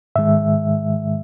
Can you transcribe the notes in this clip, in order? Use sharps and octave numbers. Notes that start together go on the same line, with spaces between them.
G#2 D#3 G#3 E5